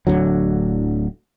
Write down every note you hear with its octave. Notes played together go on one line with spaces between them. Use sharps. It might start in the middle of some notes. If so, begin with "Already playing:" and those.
D1 A#1 D3 F#3